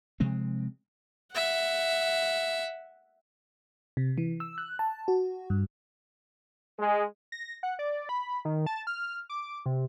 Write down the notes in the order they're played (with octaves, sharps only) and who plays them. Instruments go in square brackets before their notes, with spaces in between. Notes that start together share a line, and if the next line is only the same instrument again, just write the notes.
[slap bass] C3 F3 G#3 C4
[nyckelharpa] E5 F#5
[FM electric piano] C3
E3
E6
F#6
A5
F#4
G2
[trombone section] G#3
[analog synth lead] A#6
F#5
D5
B5
D#3
A5
F6
D6
C3